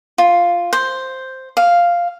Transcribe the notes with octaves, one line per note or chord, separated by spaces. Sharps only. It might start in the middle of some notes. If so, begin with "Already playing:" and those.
F4
C5
F5